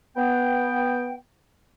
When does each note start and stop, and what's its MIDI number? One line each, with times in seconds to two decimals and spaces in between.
0.17 1.15 59
0.17 1.15 79